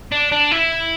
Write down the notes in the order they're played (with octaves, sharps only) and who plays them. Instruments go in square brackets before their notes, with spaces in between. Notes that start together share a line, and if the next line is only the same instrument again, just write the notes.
[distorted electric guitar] D4
D4
E4